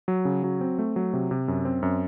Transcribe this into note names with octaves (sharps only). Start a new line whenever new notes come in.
F#3
C#3
F#3
C4
A3
F#3
C3
C3
F#2
C4
F#2